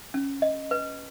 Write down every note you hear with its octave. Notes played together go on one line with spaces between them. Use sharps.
C#4
D#5
B4